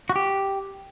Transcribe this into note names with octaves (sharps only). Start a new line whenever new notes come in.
F#4
G4